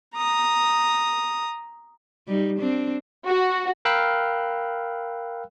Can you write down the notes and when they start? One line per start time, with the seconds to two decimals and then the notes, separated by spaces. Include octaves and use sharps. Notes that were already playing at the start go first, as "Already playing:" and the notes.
0.15 A#5 D#6
2.27 G3 D#4
2.59 C4 D4
3.26 F#4
3.85 A#4 F5 G5 B5 E6 F#6